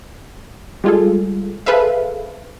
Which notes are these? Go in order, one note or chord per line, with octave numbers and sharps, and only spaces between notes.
G3 G#3 F4 G#4 A4
G#4 A4 B4 C5 E5 F5